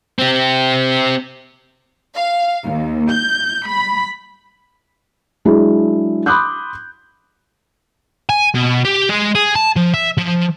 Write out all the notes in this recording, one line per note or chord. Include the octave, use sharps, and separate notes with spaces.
C4 G4
F5
D#2
G6
B5
F#3 G#3 D4 E4 G#4
B5 C6 D6 D#6 F#6 G6
G#5
B2
G4
G#3
G#4
A5
F3
E5
F3